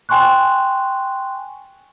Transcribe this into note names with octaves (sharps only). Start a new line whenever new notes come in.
G5 G#5 C6 C#6 F#6